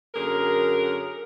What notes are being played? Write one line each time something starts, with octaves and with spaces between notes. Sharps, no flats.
F#2 D3 G#4 A#4